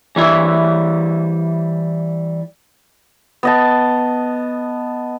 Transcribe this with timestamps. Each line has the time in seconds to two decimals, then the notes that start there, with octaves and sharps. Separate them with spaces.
0.16 E3 G3 E4 E5
3.43 B3 D#5 A5